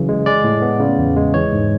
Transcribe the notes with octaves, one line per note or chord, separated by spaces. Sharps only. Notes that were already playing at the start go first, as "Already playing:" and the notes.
Already playing: C#3 E3 F#3
G#3
G#3 D5
A2
B3
C#3
E2
G#3
E3 C#5
G#2